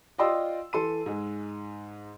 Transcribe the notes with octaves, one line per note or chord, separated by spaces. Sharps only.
F4 D5 D#5 G5 C6 E6
E3 A4 C6 D#7
G#2 G#3